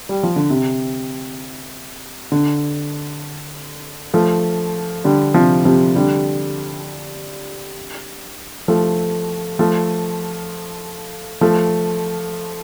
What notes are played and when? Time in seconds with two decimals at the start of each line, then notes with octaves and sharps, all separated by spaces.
0.09 G3
0.23 F3
0.36 D3
0.50 C3
2.32 D3
4.14 F3 A3
5.05 D3 G3
5.34 C3 F3
5.65 C3 F3
5.95 D3 G3
8.68 F3 A3
9.59 F3 A3
11.41 F3 A3